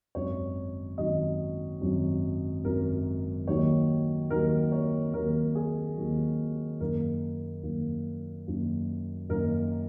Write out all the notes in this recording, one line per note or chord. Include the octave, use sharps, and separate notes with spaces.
G#1 F#2 D#3 F#3 C#5
G#1 F#2 D#3 F#3 D#5
G#1 F#2 D#3 F#3
G#1 F#2 D#3 F#3 A#4
D#2 D#3 F#3 A#3 C#5
D#2 D#3 F#3 A#3 A#4
C#5
D#2 D#3 F#3 A#3 A#4
G#4
D#2 D#3 F#3 A#3
F#2 D#3 A#3 A#4
F#2 D#3 A#3
F#2 D#3 A#3
F#2 D#3 A#3 A#4